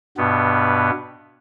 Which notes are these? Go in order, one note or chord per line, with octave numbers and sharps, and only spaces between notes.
G2 B2 B3